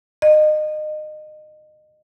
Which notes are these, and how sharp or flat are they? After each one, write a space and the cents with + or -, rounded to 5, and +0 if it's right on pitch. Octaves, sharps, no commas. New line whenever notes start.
D#5 -25